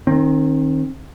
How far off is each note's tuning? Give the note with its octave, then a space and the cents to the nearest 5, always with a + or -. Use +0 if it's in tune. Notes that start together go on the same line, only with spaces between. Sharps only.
D#3 -15 C4 +30